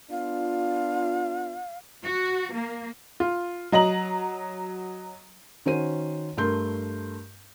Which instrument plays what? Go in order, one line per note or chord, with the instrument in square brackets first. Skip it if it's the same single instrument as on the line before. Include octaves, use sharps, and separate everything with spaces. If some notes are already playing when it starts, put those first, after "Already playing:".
[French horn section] B3 D4 F4 [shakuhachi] F5
[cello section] F#4
A#3
[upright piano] F4
F#3 D#5 A#5 F#7
[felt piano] D#3 C#4 F#4 C5 D#7
G2 A3 A#4 C6 G6